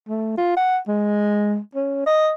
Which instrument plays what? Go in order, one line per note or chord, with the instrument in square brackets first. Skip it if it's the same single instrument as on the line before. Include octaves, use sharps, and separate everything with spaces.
[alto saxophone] A3
F4
F#5
G#3
C#4
D#5